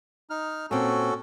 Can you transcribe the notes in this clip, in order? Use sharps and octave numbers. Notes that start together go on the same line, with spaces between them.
D#4 F6
A#2 C4 C#4 F#4 A4 G#5